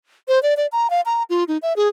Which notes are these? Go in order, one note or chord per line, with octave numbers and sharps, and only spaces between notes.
C5
D5
D5
A#5
F5
A#5
F4
D#4
E5
G#4